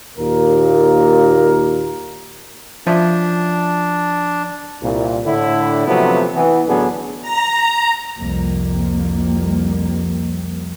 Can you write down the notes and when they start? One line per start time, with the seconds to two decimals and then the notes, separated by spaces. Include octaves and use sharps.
0.17 D#2 A#2 A#4
2.87 F3 C#4 D4 E5
4.82 C2 A#2
5.25 A2 D3 E4
5.87 C3 F3 F#3 A3 B3 C4
6.34 E3 B3
6.67 A1 D3 F#3 B3 D4 G#4
7.22 A#5
8.17 C2 F2 G3 A#3